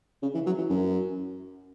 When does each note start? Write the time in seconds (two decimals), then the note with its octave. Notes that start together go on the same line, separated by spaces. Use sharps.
0.23 C#3
0.34 E3
0.47 F#3
0.58 E3
0.70 F#2